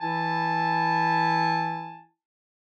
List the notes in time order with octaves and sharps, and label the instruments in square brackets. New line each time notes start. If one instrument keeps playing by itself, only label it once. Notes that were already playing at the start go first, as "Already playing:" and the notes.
[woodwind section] E3 E4 G#5 A5